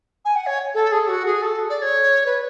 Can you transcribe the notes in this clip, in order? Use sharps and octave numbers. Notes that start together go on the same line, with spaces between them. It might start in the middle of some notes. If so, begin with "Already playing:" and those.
G#5
F#5
C#5
A4
G#4
F#4
G#4
A4
D5
C#5
B4